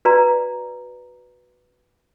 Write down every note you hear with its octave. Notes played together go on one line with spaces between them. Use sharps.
F#4 B4 D5 A#5